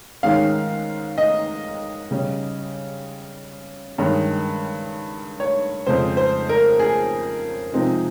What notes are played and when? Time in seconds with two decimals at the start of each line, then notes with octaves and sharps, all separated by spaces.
0.23 G#2 D#3 G#3 C#4 F5
1.18 D#5
2.11 C#3 G3 C#4
3.98 G2 D#3 G#3 C#4
5.40 C#5
5.87 F2 C#3 G#3 C5
6.17 C5
6.49 A#4
6.79 G#4
7.73 C3 F3 G#3 C4 D#4